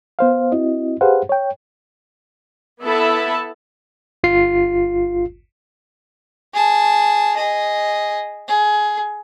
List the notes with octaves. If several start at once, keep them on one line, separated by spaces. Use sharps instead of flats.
B3 C5 F5
C4 E4 F#4 D#5
G4 G#4 B4 C5 F5 F#5
C#5 G5
B3 E4 A4 E5 A5 B5
G1 F4 C7
G#4 A5
G#4 D#5
G#4